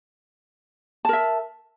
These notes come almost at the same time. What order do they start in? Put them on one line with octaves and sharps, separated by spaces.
A5 A#4 E5